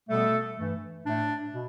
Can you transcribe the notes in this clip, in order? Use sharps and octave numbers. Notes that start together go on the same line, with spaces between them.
B2 G3 A3 B3 A4
G2 E3 A3
A2 A3 D4
B2